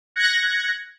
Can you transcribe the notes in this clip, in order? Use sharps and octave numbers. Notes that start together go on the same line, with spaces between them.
F#6 G#6 A#6 C#7